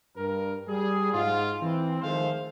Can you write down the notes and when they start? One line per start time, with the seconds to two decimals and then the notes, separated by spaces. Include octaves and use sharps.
0.16 G2 A#4
0.67 G3 G#4
1.13 G#2 F4
1.61 E3 C4
2.01 D#3 F3 G#3 A3 C5 F5